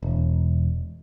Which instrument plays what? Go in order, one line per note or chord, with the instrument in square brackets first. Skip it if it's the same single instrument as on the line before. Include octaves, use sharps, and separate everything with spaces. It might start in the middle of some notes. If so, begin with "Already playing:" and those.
[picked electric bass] E1